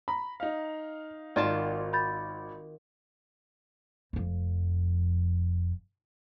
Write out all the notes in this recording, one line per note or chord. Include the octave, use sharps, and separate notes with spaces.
A#5 B5
D#4 F5
G#1 D#3 F4 D5 A5
B5 G6 A6
F1 F2